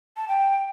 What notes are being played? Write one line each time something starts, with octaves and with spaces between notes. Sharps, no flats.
A5
G5